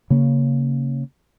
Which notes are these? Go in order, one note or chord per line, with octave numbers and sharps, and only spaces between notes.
C#3 A#3 C#4